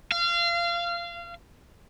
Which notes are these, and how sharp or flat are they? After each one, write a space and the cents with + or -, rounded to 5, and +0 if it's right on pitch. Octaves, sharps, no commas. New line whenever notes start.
F5 -25